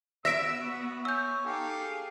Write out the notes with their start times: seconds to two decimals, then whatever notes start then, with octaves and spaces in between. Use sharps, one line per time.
0.25 B3 E5 E6 A#6 B6 D7
0.61 F#4
1.05 C#5 G#5 E6 G6
1.45 D#4 G4 A4 F5
1.78 G#4